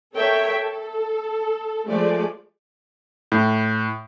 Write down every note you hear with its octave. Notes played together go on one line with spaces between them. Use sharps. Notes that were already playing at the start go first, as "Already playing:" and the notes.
A4 A#4 C#5 E5 G5
A4
F3 G#3 A3 D5
A2